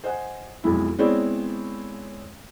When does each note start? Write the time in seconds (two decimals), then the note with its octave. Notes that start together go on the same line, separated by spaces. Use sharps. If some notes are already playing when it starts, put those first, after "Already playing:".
0.04 C5 D#5 F#5 G#5
0.64 B1 F2 G#2 E4
0.98 G#3 B3 C4 E4 C#5 D5